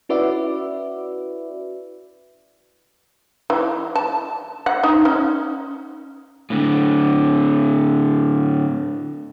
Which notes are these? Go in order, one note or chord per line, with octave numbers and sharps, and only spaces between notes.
C#4 E4 F#4 B4 D5 E5
E3
A5
F#5
D#4
C#4
A2 D3